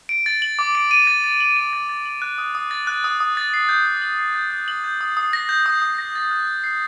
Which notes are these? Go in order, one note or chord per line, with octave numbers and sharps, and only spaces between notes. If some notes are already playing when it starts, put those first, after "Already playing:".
D7
A6
F#7
D6
D7
D#7
A6
A6
F#7
D#7
A6
A6
F#7
F#6
D#6
D#6
A6
F#6
D#6
D#6
A6
C7
G6
G6
F#7
C7
G6
G6
F#7
G6
D#6
D#6
A#6
G6
D#6
D#6
A#6
A6
F#6
F#6
C7